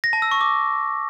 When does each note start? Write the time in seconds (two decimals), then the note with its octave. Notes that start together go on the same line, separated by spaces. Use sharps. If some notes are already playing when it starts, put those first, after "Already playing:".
0.04 A#6
0.13 A5
0.22 E6
0.31 C#6
0.41 D6